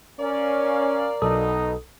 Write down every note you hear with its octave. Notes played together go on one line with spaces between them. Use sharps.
C#4 A#4 D5 F5
B1 B2 D#4 A4 D#6